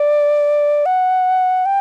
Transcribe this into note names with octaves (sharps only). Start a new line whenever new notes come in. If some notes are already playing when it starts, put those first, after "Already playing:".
Already playing: D5
F#5
G5